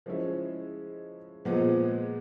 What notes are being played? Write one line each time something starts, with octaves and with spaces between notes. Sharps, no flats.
F3 G#3 C#4 E4
A#2 F3 G#3 B3